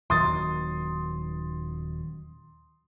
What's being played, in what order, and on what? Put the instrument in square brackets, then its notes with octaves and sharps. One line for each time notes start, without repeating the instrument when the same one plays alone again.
[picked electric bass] D#1 D#3 F#3 [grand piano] C6 D#6 A6